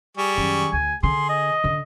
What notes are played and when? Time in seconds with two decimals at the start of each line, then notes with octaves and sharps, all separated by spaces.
0.17 G3 G#4 C#6
0.37 F#2 D#3
0.73 D2 G#5
1.03 D3 G#4 C6
1.29 D#5
1.64 D3